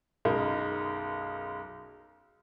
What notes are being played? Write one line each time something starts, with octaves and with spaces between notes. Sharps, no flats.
B1 F#2 G#3 A#4 D#5 B5